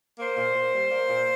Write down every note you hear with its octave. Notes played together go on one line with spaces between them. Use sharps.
A#3 C5
A#2
A#2
G3
A#3
A#2